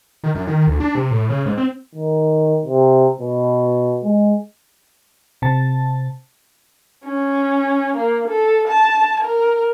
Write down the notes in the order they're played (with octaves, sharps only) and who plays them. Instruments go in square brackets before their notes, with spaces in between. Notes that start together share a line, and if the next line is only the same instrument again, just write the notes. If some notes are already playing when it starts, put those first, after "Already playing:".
[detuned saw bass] D#3
F#2
D#3
D2
D4
C3
A2
C#3
G#2
C4
[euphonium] D#3
C3
B2
G#3
[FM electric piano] C3 A5
[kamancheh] C#4
A#3
A4
A5
A#4